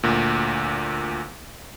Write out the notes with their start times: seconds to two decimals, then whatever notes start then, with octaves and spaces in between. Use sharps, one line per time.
0.03 D2 A#2